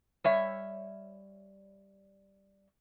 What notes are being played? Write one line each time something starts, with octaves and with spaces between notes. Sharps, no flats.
G3 C#5 E5